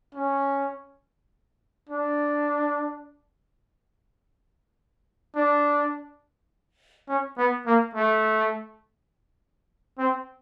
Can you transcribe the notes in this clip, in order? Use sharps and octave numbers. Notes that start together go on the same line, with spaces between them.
C#4
D4
D4
C#4
B3
A#3
A3
C4